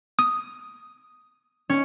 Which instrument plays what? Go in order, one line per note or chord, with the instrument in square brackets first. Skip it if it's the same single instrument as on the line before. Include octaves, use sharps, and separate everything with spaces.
[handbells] D#6
[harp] C#4